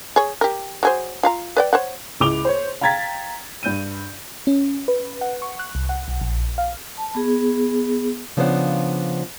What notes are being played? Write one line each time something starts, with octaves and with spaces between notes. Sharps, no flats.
G#4 C#5
G4 A#4
F#3 G#4 C5
F4 F5 A#5
B4 D5 G5
C5 C#5 F#5
C#2 E4 D6 F7 G7
C5 C#5
F5 G5 A#5 G#6 A6 B6
G2 G6 D#7
C#4
B4
F#5
C#6
F#6
C2
F#5
B1
A#1
F5
A5
B3 G#4
C#3 F3 B3 D4 C5 F#5